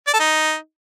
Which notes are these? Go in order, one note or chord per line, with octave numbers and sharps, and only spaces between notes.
D5
A4
D#4